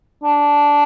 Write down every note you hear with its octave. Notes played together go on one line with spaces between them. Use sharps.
D4